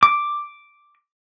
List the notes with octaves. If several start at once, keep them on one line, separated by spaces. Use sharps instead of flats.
D6